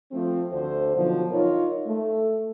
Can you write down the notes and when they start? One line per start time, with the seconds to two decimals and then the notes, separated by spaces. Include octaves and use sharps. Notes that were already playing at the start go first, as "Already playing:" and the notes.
0.12 F3 A3 C4
0.52 D2 D3 C5
0.96 B2 D3 D#3 F3 F#3
1.31 D#4 F4 A#4 C#5
1.87 A3